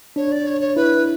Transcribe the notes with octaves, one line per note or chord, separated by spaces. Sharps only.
D4 C#5
D5
C#5
C#5
E4 B4